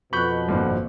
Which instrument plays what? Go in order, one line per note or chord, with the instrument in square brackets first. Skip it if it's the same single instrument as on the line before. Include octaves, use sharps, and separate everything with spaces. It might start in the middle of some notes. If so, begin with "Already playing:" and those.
[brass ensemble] F2 B2 [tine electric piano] B5 G6 [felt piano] C#6 F#6
[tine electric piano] G#1 C5 [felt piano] G2 A#2